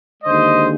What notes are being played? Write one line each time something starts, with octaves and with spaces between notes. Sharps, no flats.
D#2 D3 G#3 C5 D#5